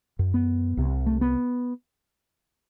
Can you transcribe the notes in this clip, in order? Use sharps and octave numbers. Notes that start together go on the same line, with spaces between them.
F#2
B3
C2 C3
A3
B3